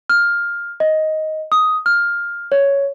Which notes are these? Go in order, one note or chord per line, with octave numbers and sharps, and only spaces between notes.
F6
D#5
D#6
F6
C#5